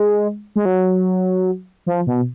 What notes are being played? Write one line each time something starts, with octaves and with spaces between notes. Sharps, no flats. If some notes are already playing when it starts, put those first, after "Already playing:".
Already playing: G#3
G#3
F#3
F3
B2